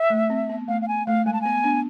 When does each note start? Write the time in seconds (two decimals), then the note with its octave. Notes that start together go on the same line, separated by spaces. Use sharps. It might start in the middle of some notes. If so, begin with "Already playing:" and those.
Already playing: E5
0.10 A3
0.30 C4
0.49 B3
0.68 A3 F5
0.82 F5
0.88 G#5
1.07 A3 F5
1.26 G#3 G#5
1.33 A5
1.41 B3 G#5
1.64 B3 D4